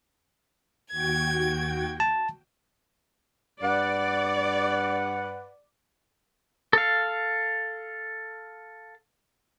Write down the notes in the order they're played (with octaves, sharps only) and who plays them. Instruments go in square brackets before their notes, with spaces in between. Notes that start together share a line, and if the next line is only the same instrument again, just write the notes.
[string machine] D#2 F#4 G5 [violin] G#6
[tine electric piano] A5
[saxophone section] G2 B4 F#5 [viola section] D5
[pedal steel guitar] A4 F5